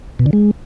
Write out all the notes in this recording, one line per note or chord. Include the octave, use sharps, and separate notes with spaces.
B2
D3
G#3